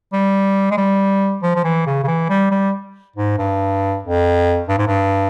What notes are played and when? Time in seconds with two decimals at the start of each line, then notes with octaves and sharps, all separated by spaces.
0.13 G3
0.71 G#3
0.77 G3
1.42 F3
1.55 F3
1.64 E3
1.87 C#3
2.03 C#3
2.07 E3
2.29 G3
2.51 G3
3.16 G#2
3.38 G2
4.03 F2
4.68 G2
4.78 G#2
4.87 G2